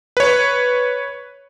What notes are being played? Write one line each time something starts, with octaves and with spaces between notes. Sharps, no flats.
B4 C#5